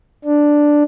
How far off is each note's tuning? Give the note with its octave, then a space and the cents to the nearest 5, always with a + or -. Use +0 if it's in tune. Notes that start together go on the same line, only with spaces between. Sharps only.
D4 +5